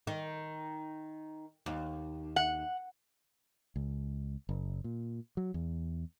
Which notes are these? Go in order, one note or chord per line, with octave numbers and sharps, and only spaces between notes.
D#3
D#2
F#5
C#2
F#1
A#2
F#3
E2